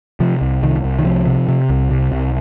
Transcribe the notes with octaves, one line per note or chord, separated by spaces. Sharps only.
C3 F3
C2
C2 D#3
C2
D#3
C3 F3
C3
C3
C2
C3
C2